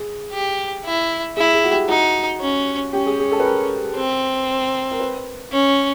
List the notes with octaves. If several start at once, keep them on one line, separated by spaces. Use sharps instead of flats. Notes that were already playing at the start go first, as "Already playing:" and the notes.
Already playing: G#4
G4
E4
E4 G#4
G#4
F#4
G4
D#4 F#4
C#4
C#4 G4
G#4
G#4
A4
B4
A#4
C4
A#4
B4
C#4